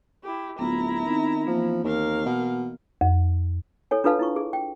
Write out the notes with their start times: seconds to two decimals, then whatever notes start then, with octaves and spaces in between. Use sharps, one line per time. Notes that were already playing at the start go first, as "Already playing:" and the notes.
0.23 E4 G4
0.59 D1 B3 E4 F4 A#5
1.06 D#3 C4 D#4
1.47 E3 F3 A#3
1.84 D#2 A#4 F5
2.25 B2
3.01 F2
3.91 E4 A4 C#5 G#5
4.04 D4 F4 A4 B4 F5 A5
4.19 E4 F4 C#6
4.36 G#4
4.53 G5